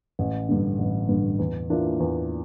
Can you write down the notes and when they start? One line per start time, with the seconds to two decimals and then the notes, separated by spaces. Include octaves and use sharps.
0.19 A1
0.49 G2 D3
0.79 A1
1.08 G2 D3
1.39 E2
1.70 E3 A#3 D4 F4
2.00 E2